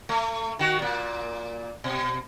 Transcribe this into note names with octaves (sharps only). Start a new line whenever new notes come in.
A3
D#3 F#4
A#2 A#3
B2